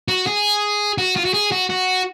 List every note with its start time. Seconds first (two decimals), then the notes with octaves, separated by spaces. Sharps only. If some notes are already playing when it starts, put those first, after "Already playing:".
0.08 F#4
0.27 G#4
0.98 F#4
1.16 F4
1.25 F#4
1.34 G#4
1.52 F#4
1.69 F#4